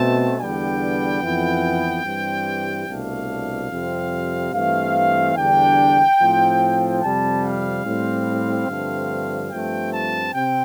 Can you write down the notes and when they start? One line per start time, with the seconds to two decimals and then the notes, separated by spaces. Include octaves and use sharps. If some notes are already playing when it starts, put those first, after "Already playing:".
Already playing: B2 A3 C4 A5
0.39 E2 D3 G3 B3 D4 G5
1.22 F2 E3 B3
2.04 G2 E3 G3 C4
2.87 C2 B2 A3 D4 F5
3.71 F2 C3 G3 C4
4.53 G2 E3 A3 C4 F5
5.36 E2 D3 G3 D4 G5
6.20 A2 F3 C4
7.02 F2 C3 G3 A5
7.44 F5
7.85 A2 G3 C4
8.68 G2 D3 F3 A3 C4
9.51 G2 F3 A3 C4 G5
9.93 A5
10.33 C3 C4 G5